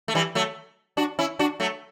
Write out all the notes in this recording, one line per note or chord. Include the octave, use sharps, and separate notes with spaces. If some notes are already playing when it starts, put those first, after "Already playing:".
A3
E3 G3
F#3 A3
D4 F#4
C#4 E4
D4 F#4
F#3 A3